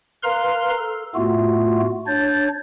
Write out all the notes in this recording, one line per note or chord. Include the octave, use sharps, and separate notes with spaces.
A#4 B4 F5 A#5 C6 F6
A4
A2 A3 B3 F4 F#4
D4 C#5 G6 A6